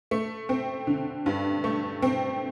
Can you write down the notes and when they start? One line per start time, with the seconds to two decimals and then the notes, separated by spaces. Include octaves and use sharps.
0.11 A3
0.49 C4
0.87 D3
1.26 G2
1.64 A3
2.02 C4